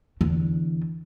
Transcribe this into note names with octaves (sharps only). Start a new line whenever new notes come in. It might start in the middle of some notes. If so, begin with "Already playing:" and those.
E2 D3